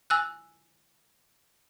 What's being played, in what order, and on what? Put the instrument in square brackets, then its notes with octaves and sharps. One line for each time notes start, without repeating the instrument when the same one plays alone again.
[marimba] G#5 E6 F#6